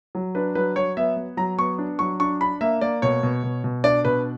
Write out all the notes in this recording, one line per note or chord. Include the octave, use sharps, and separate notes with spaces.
F#3
D4 B4
F#3 B4
F#3 C#5
B3 E5
B3
F#3 A#5
B3 C#6
D4
F#3 C#6
D4 C#6
D4 B5
A#3 E5
A#3 D5
B2 C#5
B2
B2
B2
D4 D5
B2 B4